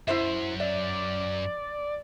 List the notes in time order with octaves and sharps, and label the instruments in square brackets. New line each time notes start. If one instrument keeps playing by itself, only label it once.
[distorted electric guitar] F#2 [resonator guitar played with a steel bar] E4 C5 E5
[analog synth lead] D5 [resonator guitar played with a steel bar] E5